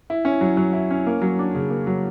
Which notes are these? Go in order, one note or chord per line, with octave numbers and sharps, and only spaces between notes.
E4
C#4
F#3
F#3
E4
C#4
A#3
F#3
D4
C#3
A#3
F#3